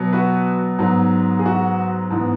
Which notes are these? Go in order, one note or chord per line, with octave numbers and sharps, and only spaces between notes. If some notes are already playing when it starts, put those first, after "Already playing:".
Already playing: B2 F#3 B3
F#4 B4
G#2 F#3 B3
G#4
F#4
G#2 E3 B3